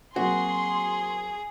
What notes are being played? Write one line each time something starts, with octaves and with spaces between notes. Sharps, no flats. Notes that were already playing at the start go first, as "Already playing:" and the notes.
F#3 A#3 C4 F#4 G#4 C6